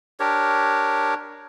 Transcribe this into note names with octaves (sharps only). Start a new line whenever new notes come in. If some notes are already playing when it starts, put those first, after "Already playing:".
D4 G4 A#4 C#5